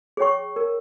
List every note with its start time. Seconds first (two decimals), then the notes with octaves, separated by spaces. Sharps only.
0.17 G#4 C#5 G5 C#6
0.56 A#4